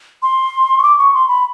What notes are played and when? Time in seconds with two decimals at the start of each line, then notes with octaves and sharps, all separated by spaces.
0.23 C6
0.78 C#6
0.83 D6
0.98 C#6
1.14 C6
1.28 B5